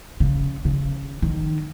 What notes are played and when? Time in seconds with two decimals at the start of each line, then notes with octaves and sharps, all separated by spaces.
0.20 C#3
0.65 C#3
1.22 D#3